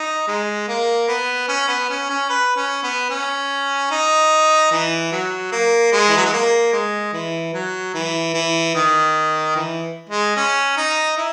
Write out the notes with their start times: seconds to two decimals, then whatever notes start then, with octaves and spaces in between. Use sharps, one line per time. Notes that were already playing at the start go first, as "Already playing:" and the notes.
Already playing: D#4
0.27 G#3
0.68 A#3
1.08 B3
1.48 C#4
1.68 B3
1.89 C#4
2.09 C#4
2.29 B4
2.56 C#4
2.83 B3
3.10 C#4
3.91 D#4
4.71 E3
5.12 F#3
5.52 A#3
5.92 G#3
6.09 E3
6.17 F#3
6.25 G#3
6.33 A#3
6.73 G#3
7.13 E3
7.54 F#3
7.94 E3
8.34 E3
8.75 D#3
9.56 E3
10.09 G#3
10.36 C#4
10.77 D#4
11.17 E4